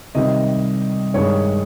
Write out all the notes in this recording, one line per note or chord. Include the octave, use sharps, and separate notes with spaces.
C3 D#3 G3 D#5
G2 D#3 G#3 C#5